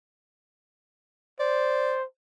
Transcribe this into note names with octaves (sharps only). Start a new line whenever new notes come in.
C5 D5